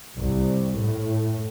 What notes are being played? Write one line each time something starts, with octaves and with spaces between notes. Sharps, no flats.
C2
A2